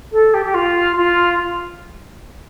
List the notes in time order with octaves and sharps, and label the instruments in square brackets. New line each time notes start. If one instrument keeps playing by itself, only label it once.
[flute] A4
G4
G4
F4
F4